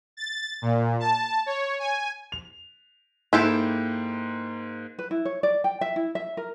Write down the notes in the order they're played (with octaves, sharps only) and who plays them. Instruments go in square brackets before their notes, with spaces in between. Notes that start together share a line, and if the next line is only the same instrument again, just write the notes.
[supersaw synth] A6
A#2
A5
C#5
G#5
[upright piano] F7
[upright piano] G#2 A#3 G6 [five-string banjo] E4 G4 A4
[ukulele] B4
E4
C#5
D5
G5
E5
E4
E5
A#4